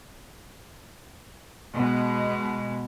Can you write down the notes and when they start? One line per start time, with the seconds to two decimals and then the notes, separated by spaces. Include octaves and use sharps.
1.73 B2 G#3